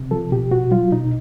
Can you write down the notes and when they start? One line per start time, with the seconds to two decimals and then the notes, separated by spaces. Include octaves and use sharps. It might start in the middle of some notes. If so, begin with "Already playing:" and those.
Already playing: C3
0.11 F3 A4
0.32 B2 G4
0.51 B2 F#4
0.71 F#3 F4
0.92 B2 D#4